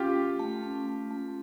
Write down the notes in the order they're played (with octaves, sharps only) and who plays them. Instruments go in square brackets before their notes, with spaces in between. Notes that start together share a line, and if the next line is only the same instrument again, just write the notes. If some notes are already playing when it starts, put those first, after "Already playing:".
Already playing: [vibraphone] C#4 [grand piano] F4 G4
[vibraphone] A3
A3
C#4
A3
A3